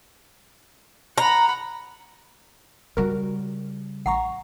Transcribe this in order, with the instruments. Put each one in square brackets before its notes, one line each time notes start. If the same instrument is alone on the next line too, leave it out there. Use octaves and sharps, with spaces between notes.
[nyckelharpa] F#5 B5 [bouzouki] A#5
[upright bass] C#3 G3 [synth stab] F#4 A#4
[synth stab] A1 A#5 C#6 [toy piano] F#5